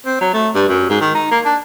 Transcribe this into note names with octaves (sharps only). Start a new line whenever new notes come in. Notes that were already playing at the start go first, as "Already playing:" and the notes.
C4
F#3
A3
G2
F#2
G#2
D#3
D#4
A#3
D4